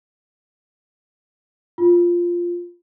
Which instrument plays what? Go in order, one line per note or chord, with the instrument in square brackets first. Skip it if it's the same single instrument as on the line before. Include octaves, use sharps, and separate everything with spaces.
[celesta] F4